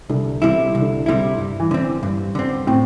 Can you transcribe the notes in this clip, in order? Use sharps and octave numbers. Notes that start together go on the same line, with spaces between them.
C2 D3
C3 E3 G3 E4
D3
C2
D3
C3 G3 E4
G2
E3
D3 C4
G2
D3 C4
A2 C4